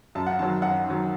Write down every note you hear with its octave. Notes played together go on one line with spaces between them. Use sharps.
F#2 A5
F#5
D#3 F#3 A5
F#2 F#5
D#3 F#3